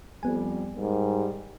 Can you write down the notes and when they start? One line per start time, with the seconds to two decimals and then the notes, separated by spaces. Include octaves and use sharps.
0.23 F2 G3 B3 G#5
0.76 G#2 G3 A#4